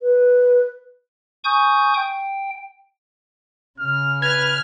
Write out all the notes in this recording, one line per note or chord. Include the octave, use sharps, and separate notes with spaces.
B4
G#5 C#6 D#6 G6
G5
C#3 F6
B4 F6 G#6